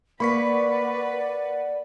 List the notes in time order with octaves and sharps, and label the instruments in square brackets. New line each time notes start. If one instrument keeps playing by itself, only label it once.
[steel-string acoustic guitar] A#3 [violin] B4 [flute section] D5 F#5 [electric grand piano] B5 C#6 B6